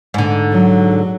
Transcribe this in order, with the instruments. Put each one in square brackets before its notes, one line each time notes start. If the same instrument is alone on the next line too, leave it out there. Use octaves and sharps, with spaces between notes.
[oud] G#2 D3
[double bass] F#3